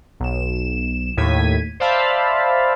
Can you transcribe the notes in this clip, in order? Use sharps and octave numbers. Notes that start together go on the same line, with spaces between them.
B1 E7
D#2 A2 G#6 B6 D#7
C5 D5 E5 F5 A5 B5